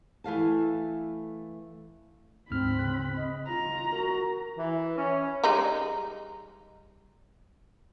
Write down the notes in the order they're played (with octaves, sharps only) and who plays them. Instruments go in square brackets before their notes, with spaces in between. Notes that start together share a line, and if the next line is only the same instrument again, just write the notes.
[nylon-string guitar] E3 A3 F5 A5
[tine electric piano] D2 G#2 F6 [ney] C4 [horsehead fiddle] B5
[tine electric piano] C#3 F#6
[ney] D#5
[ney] F4 [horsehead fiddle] A#5
[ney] F#4 [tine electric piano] A#4
[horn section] E3
C#4
[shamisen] G3 G#3 D#4